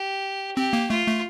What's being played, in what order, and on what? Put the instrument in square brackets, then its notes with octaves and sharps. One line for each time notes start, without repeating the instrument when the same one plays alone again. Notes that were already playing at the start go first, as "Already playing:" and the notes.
Already playing: [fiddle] G4
[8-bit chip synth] C4 [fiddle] G4
[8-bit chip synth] A#3
[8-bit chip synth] A3 [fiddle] F4
[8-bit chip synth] A3